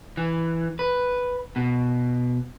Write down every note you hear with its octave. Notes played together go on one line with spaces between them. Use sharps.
E3
B4
B2